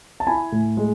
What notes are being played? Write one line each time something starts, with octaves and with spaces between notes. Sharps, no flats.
A5
E4 G#5 B5
A2
G#3